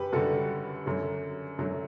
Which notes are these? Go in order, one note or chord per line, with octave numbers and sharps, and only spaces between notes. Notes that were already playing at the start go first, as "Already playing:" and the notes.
Already playing: F#2 G3 G4 B4
F#2 D3 G3 F#4 A4
F#2 D3 F#3
F#2 D3 F#3